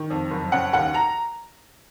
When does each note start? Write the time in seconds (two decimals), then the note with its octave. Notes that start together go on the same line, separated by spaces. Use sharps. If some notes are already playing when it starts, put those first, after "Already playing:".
Already playing: D#3
0.10 F2
0.31 F#1
0.52 C#3 F#5
0.73 D#2 F#5
0.94 A#5